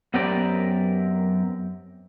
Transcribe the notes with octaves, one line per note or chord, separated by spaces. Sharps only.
F#2 B3 C4 G4 A#4 D5